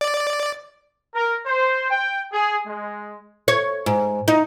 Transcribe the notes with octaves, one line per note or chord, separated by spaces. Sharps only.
D5
A#4
C5
G5
G#4
G#3
C#5
G#2
D#4